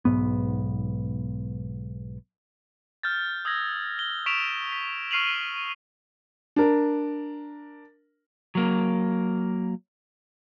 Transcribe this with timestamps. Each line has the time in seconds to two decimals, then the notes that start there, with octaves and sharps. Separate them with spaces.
0.05 B1 G#2 B3
3.03 F6 G6 A6
3.45 D#6 E6 G#6 A#6
3.99 G7
4.26 C#6 B6 D7 E7 F7
4.72 B6
5.11 C#6 F6 C7 D#7 F7 F#7
6.56 D4 A#4
8.55 F#3 A#3